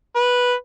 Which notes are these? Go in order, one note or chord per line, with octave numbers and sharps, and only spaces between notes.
B4